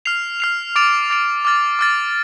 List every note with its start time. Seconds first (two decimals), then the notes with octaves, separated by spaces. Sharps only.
0.05 F6 C7 F7
0.40 F6 C7 F7
0.76 D6 A6 D7 F7
1.10 D6 A6 D7 F7
1.45 D6 F6 A6
1.79 D6 F6 A6